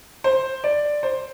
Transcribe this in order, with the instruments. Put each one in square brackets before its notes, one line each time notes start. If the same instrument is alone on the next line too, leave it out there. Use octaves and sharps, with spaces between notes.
[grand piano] C5
D5
C5